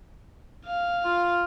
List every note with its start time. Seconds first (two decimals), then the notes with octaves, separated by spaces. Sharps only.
0.66 F5
1.05 F4